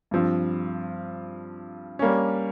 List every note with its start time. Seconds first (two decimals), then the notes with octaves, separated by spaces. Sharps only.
0.11 G2 F3 C4
1.99 G3 A#3 C#4